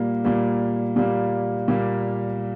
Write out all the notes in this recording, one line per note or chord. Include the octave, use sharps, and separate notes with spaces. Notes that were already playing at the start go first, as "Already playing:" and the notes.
Already playing: A#2 G3 A#3
A#2 G3 A#3
A#2 G3 A#3
A#2 G3 A#3